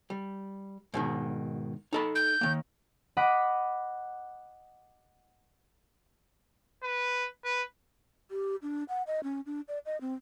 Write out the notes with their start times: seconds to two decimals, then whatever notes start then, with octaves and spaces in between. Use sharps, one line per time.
0.10 G3
0.94 G#2 B2 D#3
1.93 D#4 A4 B5
2.15 G6
2.41 D#3 A#3
3.17 D#5 F#5 B5 D6 B6
6.83 B4
7.44 B4
8.31 G4
8.62 D4
8.89 F#5
9.07 D#5
9.24 C#4
9.46 D4
9.68 D5
9.86 D#5
10.01 C4